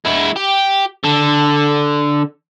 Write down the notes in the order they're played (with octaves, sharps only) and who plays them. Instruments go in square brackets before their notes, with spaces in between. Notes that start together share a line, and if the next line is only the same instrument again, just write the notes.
[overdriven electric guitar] G#3 E4
G4
D3 A4